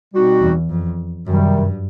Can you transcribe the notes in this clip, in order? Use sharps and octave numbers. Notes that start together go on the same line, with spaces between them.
B2 G3 C4 D#4 F#4
E2
F2
F#2 C3 D#3 G3
G2